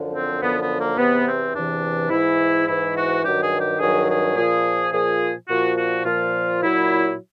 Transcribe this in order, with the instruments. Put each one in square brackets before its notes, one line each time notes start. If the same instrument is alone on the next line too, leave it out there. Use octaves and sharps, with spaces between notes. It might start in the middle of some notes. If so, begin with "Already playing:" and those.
Already playing: [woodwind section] F#2 D3 F3
C4
F#2 D3 F3 B3
B3
A#3
E2 C3 E3 B3
C4
E2 C3 E3 D4
G#2 E3 E4
G#2 E3 E4
F#4
G2 D#3 F#3 G4
G#4
G4
G2 D#3 F#3 G#4
G#4
A#2 F3 G#4
A#2 F3 G#4
A#2 F3 F#4
F#4
A#2 F3 F4
A#2 F#3 E4